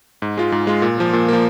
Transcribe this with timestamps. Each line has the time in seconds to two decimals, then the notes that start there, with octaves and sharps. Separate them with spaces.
0.22 G#2
0.37 G#3 F4
0.52 G#2
0.67 G#3 F4
0.82 A#2
0.98 F3 A#3
1.13 A#2
1.28 F3 A#3